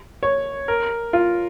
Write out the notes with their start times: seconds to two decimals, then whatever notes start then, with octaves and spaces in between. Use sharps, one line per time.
0.23 C#5
0.68 A#4
1.13 F4